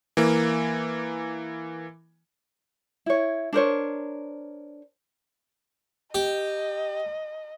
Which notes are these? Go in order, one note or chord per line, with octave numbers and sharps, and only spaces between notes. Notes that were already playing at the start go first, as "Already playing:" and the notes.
E3 A#3
E4 C#5
D4 A#4 C5 C#5
G4 D#5